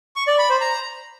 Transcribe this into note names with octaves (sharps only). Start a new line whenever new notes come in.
C#6
D5
B5
C5
A#5